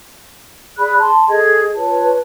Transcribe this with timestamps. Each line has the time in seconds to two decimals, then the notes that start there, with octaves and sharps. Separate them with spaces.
0.77 G#4 D5 B5 F#6
0.97 A5 C6
1.29 G#4 A4 D#5 G#6
1.74 F4 B4 C#5 A5